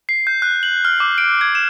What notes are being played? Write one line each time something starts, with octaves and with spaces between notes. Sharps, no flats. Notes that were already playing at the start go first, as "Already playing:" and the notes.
C7
G6
F#6
F#7
F6
D6
D7
G#6
E7